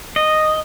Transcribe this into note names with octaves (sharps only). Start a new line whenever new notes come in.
D#5